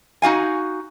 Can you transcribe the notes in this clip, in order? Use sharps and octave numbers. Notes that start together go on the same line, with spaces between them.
D#4 F#4 F5 G#5